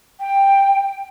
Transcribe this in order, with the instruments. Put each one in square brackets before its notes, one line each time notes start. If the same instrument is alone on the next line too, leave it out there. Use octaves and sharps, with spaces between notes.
[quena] G5